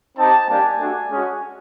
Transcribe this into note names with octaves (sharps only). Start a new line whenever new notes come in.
C4 D#4 G4 A5
G3 A#3 D4 G4 G#5
A3 D4 F#4
G#3 C#4 F#4